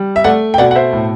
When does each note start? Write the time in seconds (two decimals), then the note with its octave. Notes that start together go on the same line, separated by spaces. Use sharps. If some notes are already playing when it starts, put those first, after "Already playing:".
Already playing: G3
0.16 E5
0.24 A3 D5 F#5
0.54 G5
0.58 B2 D5 F#5
0.71 F#5
0.75 C5 E5
0.93 A2